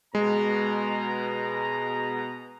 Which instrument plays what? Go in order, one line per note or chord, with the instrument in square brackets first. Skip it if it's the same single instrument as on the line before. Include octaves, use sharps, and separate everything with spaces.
[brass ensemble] B2 A#5 [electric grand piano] G#3